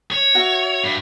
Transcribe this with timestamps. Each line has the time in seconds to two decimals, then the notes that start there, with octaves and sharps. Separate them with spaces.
0.11 C#5
0.35 F#4 E5
0.84 G2